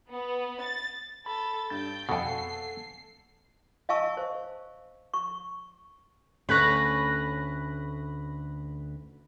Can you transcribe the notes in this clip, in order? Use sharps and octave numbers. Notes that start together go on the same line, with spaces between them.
B3
A6
A4 B5 A6
G2 G5 G6 A6
F2 B2 A4 F#5 G#5 C7
D#5 F5 G#5 A5 C#6 E6
C5
C#6
D2 A3 C#4 B4 C#5 B5 F#6 A#6